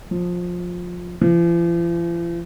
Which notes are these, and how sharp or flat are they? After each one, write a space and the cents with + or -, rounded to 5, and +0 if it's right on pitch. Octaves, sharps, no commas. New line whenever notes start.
F3 +20
F3 -45